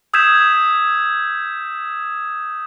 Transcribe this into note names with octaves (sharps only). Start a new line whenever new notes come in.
D#6 E6 G6 G#6 B6 E7